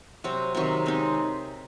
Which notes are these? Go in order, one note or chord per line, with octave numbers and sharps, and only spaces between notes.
C3 F#3 C4 F#4
C3 D#3 F#3
G#3 C4 D#4